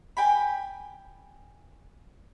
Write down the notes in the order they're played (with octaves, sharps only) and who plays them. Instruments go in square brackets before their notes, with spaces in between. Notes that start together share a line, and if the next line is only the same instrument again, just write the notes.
[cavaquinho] D5 G5 G#5 B5